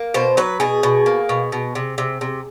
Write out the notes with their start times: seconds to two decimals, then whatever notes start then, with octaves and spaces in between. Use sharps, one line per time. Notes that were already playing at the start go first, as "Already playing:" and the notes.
Already playing: A#3
0.14 B2 C5
0.37 F#3 B4
0.60 B2 G#4
0.83 B2
1.06 A#3
1.29 B2
1.52 B2
1.75 C3
1.98 C3
2.21 C3